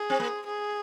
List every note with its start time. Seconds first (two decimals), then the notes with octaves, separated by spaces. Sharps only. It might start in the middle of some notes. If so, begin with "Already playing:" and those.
Already playing: G#4
0.10 C4
0.20 A#3
0.46 G#4